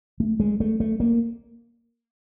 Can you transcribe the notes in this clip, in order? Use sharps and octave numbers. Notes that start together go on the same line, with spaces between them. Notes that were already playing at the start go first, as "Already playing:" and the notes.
A3
G#3
A3
A3
A#3